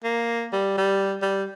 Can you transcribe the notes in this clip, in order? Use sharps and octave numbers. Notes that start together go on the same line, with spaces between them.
A#3
G3
G3
G3